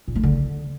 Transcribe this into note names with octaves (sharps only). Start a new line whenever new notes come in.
A#2
A3
D3